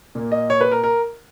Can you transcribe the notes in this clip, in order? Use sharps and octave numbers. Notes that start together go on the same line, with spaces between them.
A#2 A#3
D#5
C#5
B4
A#4
A#4